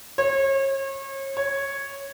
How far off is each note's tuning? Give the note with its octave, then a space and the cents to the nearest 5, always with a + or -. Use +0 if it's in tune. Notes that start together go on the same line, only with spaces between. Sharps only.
C#5 -35
C#5 -5